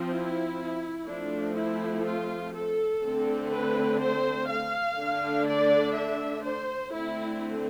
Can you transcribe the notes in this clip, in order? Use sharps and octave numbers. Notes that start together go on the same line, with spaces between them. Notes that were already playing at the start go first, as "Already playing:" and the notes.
Already playing: F3 C4
E4
F3 A3 C4 D4
E4
F4
A4
D3 A3 C4
B4
C5
F5
D3 A3 D4
D5
E5
C5
D3 A3 C4 E4